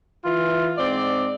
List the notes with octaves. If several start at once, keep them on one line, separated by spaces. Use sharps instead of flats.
E3 F4
G#2 C4 D5